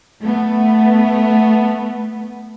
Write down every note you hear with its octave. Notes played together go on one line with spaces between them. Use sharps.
A3 B3